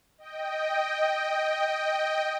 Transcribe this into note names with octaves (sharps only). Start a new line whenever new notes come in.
D#5 G5